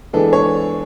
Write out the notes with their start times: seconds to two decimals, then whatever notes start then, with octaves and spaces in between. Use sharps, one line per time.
0.13 E3 G#3 B3 D4 A4
0.33 C#5